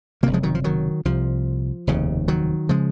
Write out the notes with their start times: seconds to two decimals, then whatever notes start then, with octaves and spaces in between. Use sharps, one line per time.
0.23 F#1 F2 C3 F#3 A#3
0.33 F3 G#3
0.43 D#3 F#3
0.55 F3
0.64 D#3 F#3
1.05 C2 C3 F3
1.87 F1 D#2 C#3
2.28 D#3 F#3
2.69 C#3 F3 G#3